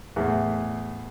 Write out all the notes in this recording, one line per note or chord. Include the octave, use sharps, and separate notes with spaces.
E2 A2